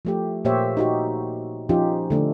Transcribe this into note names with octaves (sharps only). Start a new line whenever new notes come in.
F3 A3 G4
A#2 A#3 G4 C5 C#5 E5
D#4 F#4 G4
F3 C#4 D#4 F4 G4
D3 A3 D4